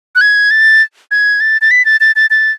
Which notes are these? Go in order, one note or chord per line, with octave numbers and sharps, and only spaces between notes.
F#6
G#6
A6
G#6
A6
A6
B6
A6
A6
A6
A6